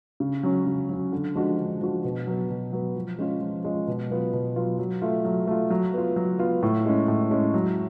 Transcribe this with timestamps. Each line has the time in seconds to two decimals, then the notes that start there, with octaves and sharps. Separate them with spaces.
0.20 C#3
0.43 F#3 C#4
0.66 C#3
0.89 F#3 C#4
1.12 D3
1.35 F3 G#3 D4 F#4
1.58 D3
1.81 F3 G#3 D4 F#4
2.04 B2
2.27 F#3 B3
2.50 B2
2.73 F#3 B3
2.96 F3
3.18 G#3 C#4 F4
3.41 F3
3.64 G#3 C#4 F4
3.88 B2
4.10 F#3 B3 F4
4.33 B2
4.56 F#3 B3 F4
4.79 F#3
5.02 A3 F4
5.25 F#3
5.47 A3 F4
5.71 F#3
5.94 B3 F4
6.16 F#3
6.39 B3 F4
6.63 A2
6.85 G#3 C#4
7.08 A2
7.31 G#3 C#4
7.54 F#3